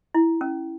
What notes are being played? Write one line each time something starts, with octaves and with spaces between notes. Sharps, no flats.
E4
C#4